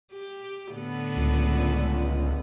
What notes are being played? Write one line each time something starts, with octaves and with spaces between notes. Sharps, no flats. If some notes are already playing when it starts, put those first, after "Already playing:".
G4
A2 D3 B3
C#2